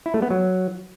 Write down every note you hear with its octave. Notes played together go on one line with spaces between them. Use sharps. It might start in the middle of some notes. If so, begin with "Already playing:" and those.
E4
A3
B3
F#3